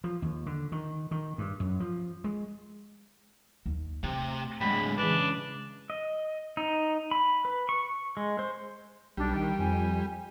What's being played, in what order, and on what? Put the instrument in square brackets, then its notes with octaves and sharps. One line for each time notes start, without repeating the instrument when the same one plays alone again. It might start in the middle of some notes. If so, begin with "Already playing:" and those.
[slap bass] F3
D#2
D3
D#3
D#3
G2
F#2
F3
G#3
[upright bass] D#2
[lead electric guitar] C3 [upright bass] A3
[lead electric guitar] A2 D3 [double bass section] G#3 [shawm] B5
[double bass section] C#3 E3 G#3 [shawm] D4 [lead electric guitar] B4
[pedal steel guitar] D#5
D#4
B5
B4
C#6
G#3
C5
[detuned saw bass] B1 [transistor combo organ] G3 [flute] D4
[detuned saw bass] D#3 [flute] G5
[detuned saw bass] F2 [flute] G#5